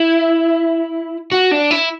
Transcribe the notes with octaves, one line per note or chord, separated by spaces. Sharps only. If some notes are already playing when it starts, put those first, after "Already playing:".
Already playing: E4
F#4
D4
E4